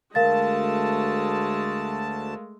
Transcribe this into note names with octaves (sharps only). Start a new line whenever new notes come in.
D2 G#3 A3 A#4 F5 A5 A6